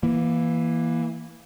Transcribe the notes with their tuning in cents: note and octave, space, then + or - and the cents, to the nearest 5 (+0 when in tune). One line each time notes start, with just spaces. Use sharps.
E3 +0 A#3 +15